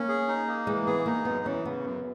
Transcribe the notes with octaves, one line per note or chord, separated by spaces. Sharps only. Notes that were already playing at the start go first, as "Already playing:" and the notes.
Already playing: A#3 C#4
G#4
D#4
A#3
E3 G#3
B3 G#4
A#3 D#4
F#2 B3
E3 C#4
C#3 B3
F#2